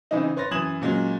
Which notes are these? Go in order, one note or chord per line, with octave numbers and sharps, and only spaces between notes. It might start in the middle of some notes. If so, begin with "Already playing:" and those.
C#3 E3 C4 D#4
B4 C#5 C6 A6 A#6
F#2 E3 D#6 G#6 E7 F#7
A#2 F#3 G#3 C#4